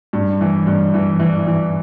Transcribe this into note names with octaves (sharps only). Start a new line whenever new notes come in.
G2
E3
G2
E3
E3
E3